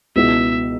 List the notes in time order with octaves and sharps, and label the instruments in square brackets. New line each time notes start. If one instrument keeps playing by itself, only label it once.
[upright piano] C#2 B2 B3 E4 [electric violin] E5